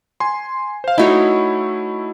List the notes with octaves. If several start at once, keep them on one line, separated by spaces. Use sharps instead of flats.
G#5 C6
C5 F5
A3 D#4 E4 F#4 C#5